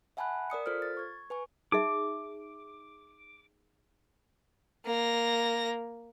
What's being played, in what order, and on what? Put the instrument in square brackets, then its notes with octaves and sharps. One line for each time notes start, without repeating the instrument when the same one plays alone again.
[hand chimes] E5 F#5 G#5 A5 B5 F#6
A#4 D5 D#6 C#7
F4 A4 C5 F6
A6
C#6 G#6
B4 G#5 C#6
[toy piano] D#4 G#4 E5 [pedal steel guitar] D6
[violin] A#3 A#6